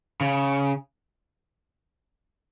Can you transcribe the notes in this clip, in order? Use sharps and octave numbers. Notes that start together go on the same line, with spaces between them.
C#3